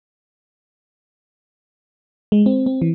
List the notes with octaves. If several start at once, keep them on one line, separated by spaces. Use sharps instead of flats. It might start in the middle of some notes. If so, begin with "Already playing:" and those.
G#3
C4
C4
E3